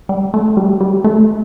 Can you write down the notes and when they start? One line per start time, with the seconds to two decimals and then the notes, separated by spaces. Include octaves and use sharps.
0.09 G3
0.34 A3
0.57 G3
0.81 G3
1.04 A3